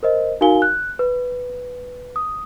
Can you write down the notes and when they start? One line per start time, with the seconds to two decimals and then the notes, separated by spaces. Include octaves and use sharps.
0.03 A#4 C5 D#5
0.41 D#4 F#4 A#4 F5 G#5 G7
0.62 F#6
0.99 B4
2.16 D#6